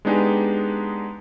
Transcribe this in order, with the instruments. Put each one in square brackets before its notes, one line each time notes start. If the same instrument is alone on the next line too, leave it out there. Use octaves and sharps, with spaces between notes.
[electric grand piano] G#3 B3 D4 D#4 G4 G#4